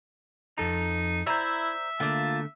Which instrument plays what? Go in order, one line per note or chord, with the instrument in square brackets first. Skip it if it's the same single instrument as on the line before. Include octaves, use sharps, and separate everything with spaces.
[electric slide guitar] F2 A4 A#5 [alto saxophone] D#4
[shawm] E4 [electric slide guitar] C5 D5 [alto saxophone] E5 [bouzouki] A#5
[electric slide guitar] D3 A3 [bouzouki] A#3 F4 [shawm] A5